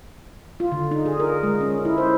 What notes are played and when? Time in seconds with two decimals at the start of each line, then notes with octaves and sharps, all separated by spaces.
0.60 F4
0.72 D3
0.91 D#4
1.06 G#4
1.20 A#4
1.43 G#3
1.61 C#4
1.85 E4
1.98 C5